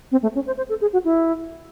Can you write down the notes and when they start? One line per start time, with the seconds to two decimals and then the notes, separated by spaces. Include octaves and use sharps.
0.12 C4
0.22 A3
0.35 C#4
0.47 C5
0.57 C5
0.69 A4
0.81 G#4
0.93 F#4
1.04 E4